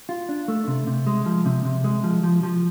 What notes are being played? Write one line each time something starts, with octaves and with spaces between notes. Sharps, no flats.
F4
D4
A3
C3
C3
G#3
F3
C3
C3
G#3
F3
F3
F3